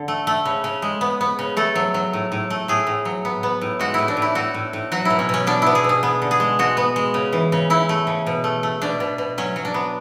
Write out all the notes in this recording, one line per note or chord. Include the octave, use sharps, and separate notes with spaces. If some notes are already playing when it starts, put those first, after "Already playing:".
Already playing: D3
A3
A3
C#3
C#3
G#3
B3
B3
C#3
A3 A4
F#3
F#3
A2
A2
A3
A2 G#4
A2
F#3
B3
B3
A2
G#3 F#4
A2 E4
D4
A2
E4
A2 F#4
A2
A2
F#3 F#4
B2 E4
C#4
B2 C#4
B3 D4
B3 E4
G#4
B2
G#4
B3
D3
G#4
G#3
G#3 F#4
B3
G#3
C#3
E3
C#3
C#3 E4
A3
C#3
B2
A3
A3
B2 D4
B2
B2
F#3 C#4
F#3
D4
B3